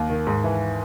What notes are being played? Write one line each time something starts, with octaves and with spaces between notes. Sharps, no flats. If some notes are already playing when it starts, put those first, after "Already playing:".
Already playing: D#2
D#3
G#2
E3